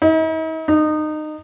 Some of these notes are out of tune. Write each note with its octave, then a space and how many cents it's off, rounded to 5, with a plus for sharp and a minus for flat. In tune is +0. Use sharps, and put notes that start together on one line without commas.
D#4 +45
D#4 -25